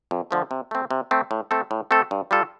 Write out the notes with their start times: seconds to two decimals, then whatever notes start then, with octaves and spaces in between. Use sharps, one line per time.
0.11 F2
0.31 D3 F3 A3
0.51 C3
0.71 A3 C4
0.91 C3
1.11 A3 C4
1.31 A2
1.51 A3 C4 A4
1.71 A2
1.91 A3 C4 A4
2.11 G2
2.31 G3 F4 A4